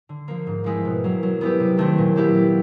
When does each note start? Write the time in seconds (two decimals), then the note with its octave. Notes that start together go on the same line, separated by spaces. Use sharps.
0.09 D3
0.28 F3 A#3
0.47 G#2
0.64 F3 G#3 C4 E4
0.85 B2
1.04 F#3 A#3
1.23 F#3
1.41 B3 E4 G4
1.60 C3
1.77 D#3 F#3 A3 C4
1.98 A#2
2.16 F#3 B3 E4 G4
2.36 F#3